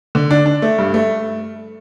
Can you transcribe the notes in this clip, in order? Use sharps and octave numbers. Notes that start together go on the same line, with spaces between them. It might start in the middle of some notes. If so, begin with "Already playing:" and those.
D3
D4
D4
A3
G2
A3